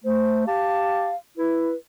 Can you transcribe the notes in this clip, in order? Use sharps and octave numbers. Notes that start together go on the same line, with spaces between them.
A3 C5
G4 F5 A5
E4 B4